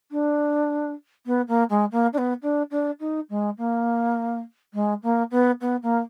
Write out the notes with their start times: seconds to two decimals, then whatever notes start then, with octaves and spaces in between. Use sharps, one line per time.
0.11 D4
1.26 B3
1.48 A#3
1.70 G#3
1.92 A#3
2.13 D4
2.18 B3
2.42 D4
2.70 D4
2.99 D#4
3.29 G#3
3.57 A#3
4.73 G#3
5.02 A#3
5.31 B3
5.61 B3
5.82 A#3